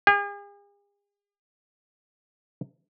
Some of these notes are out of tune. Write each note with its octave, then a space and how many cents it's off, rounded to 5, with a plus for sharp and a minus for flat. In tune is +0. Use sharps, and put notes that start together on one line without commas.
G#4 -45